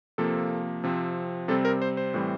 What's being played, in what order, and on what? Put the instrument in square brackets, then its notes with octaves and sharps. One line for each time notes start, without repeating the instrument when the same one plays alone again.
[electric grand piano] C3 F3 A#3 A4
C3 F3 C4
C3 G3 C4 A4
A#4
C5
C5
A2 E3 G3 C4